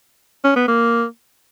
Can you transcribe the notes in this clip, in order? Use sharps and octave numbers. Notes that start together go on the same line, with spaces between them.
C#4
B3
A#3